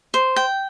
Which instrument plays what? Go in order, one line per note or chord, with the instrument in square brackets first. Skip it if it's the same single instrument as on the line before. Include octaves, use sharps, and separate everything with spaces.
[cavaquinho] C5
G5